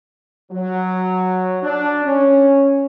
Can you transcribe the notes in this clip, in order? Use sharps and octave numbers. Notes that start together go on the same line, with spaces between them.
F#3
D4
C#4